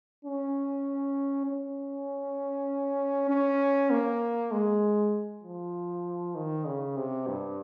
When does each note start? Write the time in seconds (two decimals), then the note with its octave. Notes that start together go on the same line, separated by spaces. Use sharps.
0.25 C#4
1.46 C#4
3.30 C#4
3.90 A#3
4.52 G#3
5.43 F3
6.35 D#3
6.66 C#3
6.97 C3
7.27 G2